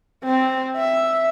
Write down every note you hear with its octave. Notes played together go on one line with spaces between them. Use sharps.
C4
E5